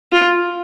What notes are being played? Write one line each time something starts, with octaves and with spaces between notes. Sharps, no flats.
F4